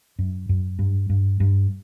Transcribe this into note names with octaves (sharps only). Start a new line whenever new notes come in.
F#2
F#2
G2
G2
G2